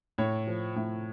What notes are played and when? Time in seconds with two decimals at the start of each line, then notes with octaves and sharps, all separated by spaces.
0.18 A2 C#5
0.47 F3
0.76 A2